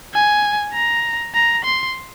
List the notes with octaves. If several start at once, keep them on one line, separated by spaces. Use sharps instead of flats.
G#5
A#5
A#5
C6